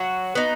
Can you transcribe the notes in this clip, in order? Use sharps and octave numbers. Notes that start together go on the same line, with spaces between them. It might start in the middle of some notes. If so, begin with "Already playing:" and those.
Already playing: F#3 F#4
B3 D#4